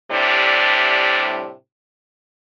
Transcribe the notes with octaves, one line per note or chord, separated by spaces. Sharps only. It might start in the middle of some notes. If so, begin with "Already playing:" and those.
A2 C3 G3 D4